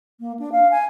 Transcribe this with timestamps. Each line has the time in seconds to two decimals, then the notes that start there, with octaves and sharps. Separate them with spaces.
0.20 A#3
0.40 D4
0.52 F5
0.71 G#5